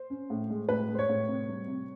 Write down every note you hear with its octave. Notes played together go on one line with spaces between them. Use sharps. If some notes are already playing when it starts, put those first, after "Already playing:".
Already playing: C5
C#4
A2
G#3
A2 B4
G#3
C5
C#5
A2
C3
G3
C3